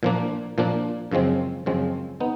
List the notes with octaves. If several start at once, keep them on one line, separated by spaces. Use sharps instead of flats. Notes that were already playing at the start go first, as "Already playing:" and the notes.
A#2 F3 A#3 D4
A#2 F3 A#3 D4
F#2 C#3 F3 G#3 C4
F#2 C#3 F3 G#3 C4
B3 D#4